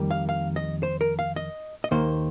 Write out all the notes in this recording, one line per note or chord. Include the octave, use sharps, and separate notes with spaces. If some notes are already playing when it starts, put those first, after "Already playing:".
Already playing: F2 D#3 G3 A#3
F5
F5
D#5
C5
A#4
F5
D#5
D#5
D#2 D#3 A#3 C5